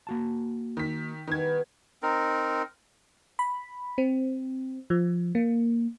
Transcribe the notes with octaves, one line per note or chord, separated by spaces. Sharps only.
A#3 F#4 A5
D#3 B6
B2 D#3 E3 G3 G#6
C4 D#4 A#4
B5
C4
F3
A#3